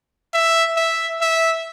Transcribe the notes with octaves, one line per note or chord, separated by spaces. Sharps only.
E5
E5
E5